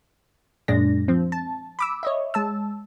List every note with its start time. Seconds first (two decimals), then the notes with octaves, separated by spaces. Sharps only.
0.68 F#2 A#2 G#3 D4 A#6
1.08 F3 C4
1.32 A5
1.79 B5 D6 E6
2.03 C#5 D#5 E5
2.34 G#3 A5 E6